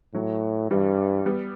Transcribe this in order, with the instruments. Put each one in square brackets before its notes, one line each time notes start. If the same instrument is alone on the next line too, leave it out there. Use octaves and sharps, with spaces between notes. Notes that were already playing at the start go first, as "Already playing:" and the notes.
[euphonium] A2 [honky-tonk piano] F#3
[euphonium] G2 [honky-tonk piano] E3 G3
[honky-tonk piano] G3 B3